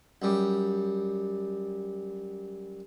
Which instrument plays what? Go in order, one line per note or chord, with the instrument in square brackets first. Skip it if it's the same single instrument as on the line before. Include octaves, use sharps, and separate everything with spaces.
[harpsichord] F#2 G3